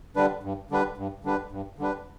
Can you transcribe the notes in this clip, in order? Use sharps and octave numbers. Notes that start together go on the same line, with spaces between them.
D3 G3 D4 B4
G2
D3 G3 D4 B4
G2
D3 G3 D4 B4
G2
D3 G3 D4 B4